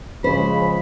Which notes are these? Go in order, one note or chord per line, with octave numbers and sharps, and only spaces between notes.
C#3 F3 G#3 C5 B5